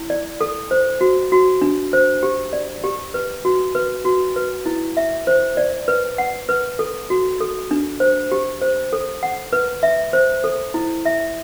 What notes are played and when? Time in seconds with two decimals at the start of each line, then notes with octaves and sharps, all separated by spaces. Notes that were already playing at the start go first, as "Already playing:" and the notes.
Already playing: E4
0.10 D5
0.41 A4
0.71 C5
1.01 F#4
1.32 F#4
1.62 D4
1.93 C5
2.23 G4
2.53 D5
2.84 G4
3.14 B4
3.45 F#4
3.75 B4
4.05 F#4
4.36 B4
4.66 E4
4.97 E5
5.27 C5
5.57 D5
5.88 B4
6.18 F#5
6.49 B4
6.79 A4
7.10 F#4
7.41 A4
7.71 D4
8.00 C5
8.32 G4
8.62 C5
8.93 A4
9.23 F#5
9.53 B4
9.83 E5
10.13 C5
10.44 A4
10.74 E4
11.06 E5